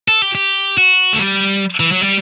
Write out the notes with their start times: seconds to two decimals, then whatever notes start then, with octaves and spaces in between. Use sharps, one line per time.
0.08 A4
0.22 G4
0.35 G4
0.77 F#4
1.13 A3
1.19 G3
1.80 E3
1.92 F#3
2.02 G3